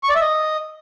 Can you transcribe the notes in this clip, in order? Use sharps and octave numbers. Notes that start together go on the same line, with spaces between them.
C#6
D5
E5
D#5